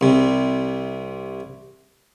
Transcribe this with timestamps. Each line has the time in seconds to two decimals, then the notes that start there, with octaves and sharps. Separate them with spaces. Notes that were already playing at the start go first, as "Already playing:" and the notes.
0.01 C2 C3